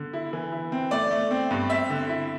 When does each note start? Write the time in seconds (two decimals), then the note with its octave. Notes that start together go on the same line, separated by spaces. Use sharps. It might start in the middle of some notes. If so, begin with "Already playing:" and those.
Already playing: D3
0.13 E4
0.33 E3
0.52 E4
0.72 C4
0.91 A3 D5
1.11 A3
1.31 C4
1.51 G2
1.70 C4 E5
1.90 D3
2.09 E4